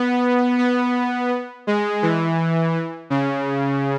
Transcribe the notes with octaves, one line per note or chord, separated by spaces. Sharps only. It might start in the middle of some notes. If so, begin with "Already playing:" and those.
Already playing: B3
B3
G#3
E3
C#3